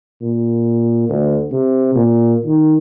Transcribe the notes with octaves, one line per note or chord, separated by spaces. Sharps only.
A#2
D2
C3
A#2
D#3